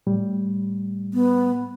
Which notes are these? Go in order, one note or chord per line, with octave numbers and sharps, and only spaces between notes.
A2 G3
B3